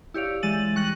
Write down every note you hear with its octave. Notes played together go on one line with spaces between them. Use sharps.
E4 G4 C#5 D5 F5
E3 G#3 E6 A6 D#7 F#7
G3 C#6 F#6 A#6 F#7